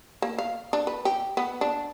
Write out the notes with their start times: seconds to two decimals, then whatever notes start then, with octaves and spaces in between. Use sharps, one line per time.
0.22 A#3
0.38 F5
0.73 D4
0.87 B4
1.05 G4
1.37 B3
1.61 D4